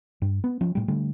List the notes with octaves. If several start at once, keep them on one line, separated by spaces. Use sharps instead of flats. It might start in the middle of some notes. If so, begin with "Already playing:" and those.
G2
B3
F3 C#4
A2 G3
D3 G3 A3